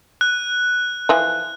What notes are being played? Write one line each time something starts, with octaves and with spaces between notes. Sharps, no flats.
F#6
E3 F3